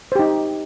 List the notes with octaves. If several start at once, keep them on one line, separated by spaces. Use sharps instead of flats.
D#4 G4 C5